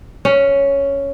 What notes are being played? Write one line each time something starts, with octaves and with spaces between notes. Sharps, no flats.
C#4